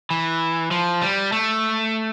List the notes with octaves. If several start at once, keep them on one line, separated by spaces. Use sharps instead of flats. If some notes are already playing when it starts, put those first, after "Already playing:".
E3
F3
G3
A3